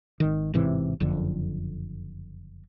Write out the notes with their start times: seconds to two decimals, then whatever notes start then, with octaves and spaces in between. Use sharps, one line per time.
0.20 G#1 D#3
0.54 A1 G#2 C3 E3
1.00 F#1 F2 D3